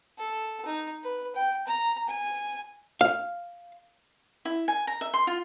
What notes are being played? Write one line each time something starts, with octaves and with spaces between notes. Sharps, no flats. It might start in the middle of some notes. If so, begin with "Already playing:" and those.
A4
D#4
B4
G5
A#5
G#5
F5
E4
G#5
A#5
E5
C6
F4